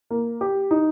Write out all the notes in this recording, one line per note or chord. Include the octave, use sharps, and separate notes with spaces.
A#3
G4
D#4